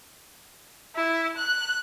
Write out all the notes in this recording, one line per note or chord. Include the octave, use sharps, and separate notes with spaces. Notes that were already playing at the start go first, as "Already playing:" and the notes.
E4
F#6